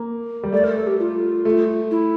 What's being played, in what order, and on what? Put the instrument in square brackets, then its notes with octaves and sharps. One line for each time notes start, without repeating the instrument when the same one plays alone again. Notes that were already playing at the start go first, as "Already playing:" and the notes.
Already playing: [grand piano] A#3
G3
[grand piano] A3 [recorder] D5
[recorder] A#4
A4
G4
F4
[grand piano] A3
[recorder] E4